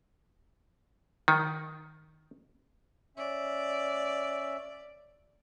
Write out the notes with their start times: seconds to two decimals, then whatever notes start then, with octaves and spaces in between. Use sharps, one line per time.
1.28 D#3
3.17 C#4 D5 E5